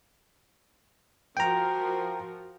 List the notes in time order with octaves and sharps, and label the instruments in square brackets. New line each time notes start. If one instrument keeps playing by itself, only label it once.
[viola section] F3 F#4 A#4 [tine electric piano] G5 A#5